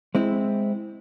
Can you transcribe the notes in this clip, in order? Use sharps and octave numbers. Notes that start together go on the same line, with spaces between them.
G#3 C4 E4